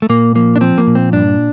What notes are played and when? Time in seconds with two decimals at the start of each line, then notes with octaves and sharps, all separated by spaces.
0.02 A3
0.09 A#2 A#3
0.35 F3 A#3
0.56 D4
0.61 F3 C4
0.78 A#3
0.87 A#2
0.95 C4
1.12 G2 D4